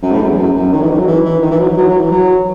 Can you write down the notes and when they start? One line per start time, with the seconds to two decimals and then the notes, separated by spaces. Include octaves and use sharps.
0.02 F#2
0.11 A2
0.20 F#2
0.29 E2
0.37 F#2
0.56 F#2
0.72 D#3
0.81 E3
0.90 D#3
0.98 F#3
1.07 E3
1.24 E3
1.42 D#3
1.50 E3
1.59 F#3
1.68 E3
1.77 F#3
1.88 F#3
1.99 E3
2.11 F#3